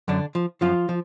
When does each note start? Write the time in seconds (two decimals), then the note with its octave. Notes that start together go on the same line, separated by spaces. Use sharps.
0.08 F#2 D3 D4
0.35 F3
0.61 F#2 F3 F4
0.89 F3